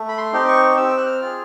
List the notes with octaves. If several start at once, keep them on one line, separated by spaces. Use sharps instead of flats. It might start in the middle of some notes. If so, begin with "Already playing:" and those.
Already playing: A3
B5
C6
C4 D#4 G4
C#6
C4 E6
F#6
F6
F4 G#4